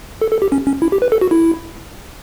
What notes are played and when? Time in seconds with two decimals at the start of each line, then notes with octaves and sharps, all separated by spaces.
0.22 A4
0.32 A4
0.42 G4
0.52 C#4
0.67 C#4
0.82 E4
0.92 G4
1.02 B4
1.12 A4
1.21 F#4
1.31 E4